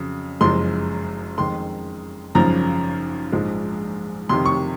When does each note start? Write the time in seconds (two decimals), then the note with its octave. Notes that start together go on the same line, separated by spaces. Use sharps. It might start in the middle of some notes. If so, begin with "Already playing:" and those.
Already playing: F2 C#3 F#3
0.41 F#1 F#2 F3 G#3 C6
1.38 F2 D#3 G#3 C6
2.35 G#1 F#2 C#3 F3 A#5
3.32 A#1 G#2 F3 G#3
4.29 F2 C3 D#3 C6
4.46 C#6